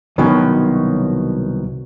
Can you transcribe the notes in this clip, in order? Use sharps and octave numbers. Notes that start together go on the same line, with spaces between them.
C2 B2 D#3 F#3 C#4